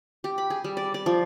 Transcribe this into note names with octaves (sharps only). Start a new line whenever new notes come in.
G4
B5
G#4
G3
D5
D5
F3